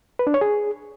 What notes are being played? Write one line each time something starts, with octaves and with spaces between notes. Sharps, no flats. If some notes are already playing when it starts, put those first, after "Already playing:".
B4
D4
C#5
G#4